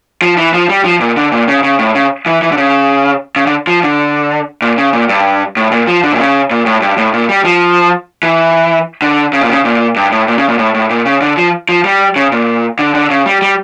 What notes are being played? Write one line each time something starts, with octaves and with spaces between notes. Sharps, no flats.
F3
E3
F3
G3
F3
A#2
D3
A#2
C#3
C#3
A2
C#3
E3
E3
D3
C#3
C#3
D3
F3
D3
A#2
C#3
A#2
G2
A2
A#2
F3
D3
A#2
C#3
A#2
A2
G2
A2
A#2
G3
F3
E3
D3
C#3
A#2
C#3
A#2
G2
A2
A#2
C#3
A#2
A2
A2
A#2
C#3
D3
F3
F3
G3
C#3
A#2
D3
D3
C#3
G3
G3